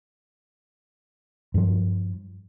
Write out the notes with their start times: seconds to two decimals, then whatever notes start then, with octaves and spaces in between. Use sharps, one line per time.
1.54 G2 F3